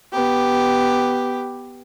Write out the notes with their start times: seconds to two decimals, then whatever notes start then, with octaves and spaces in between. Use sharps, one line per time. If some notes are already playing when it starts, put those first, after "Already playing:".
0.13 B3 G4